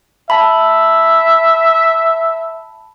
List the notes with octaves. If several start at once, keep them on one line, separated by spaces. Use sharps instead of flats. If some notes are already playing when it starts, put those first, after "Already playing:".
E5 A5 B5